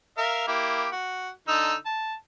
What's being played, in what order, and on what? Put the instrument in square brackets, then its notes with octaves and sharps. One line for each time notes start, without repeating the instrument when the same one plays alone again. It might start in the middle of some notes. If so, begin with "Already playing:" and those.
[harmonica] A#4 E5 F5
A#3 E4 G4
F#4
D3 D#4 E6
A5